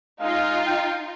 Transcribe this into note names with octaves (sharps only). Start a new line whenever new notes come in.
G#3 D#4 F4 F5
F5 G5